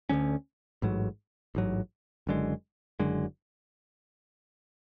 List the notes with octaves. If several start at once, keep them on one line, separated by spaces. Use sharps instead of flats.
D2 D3 F#3 C#4
A1 G#2 F#3
A1 G#2 F#3
F#1 F#2 D3 G#3
F#1 F#2 D3 G#3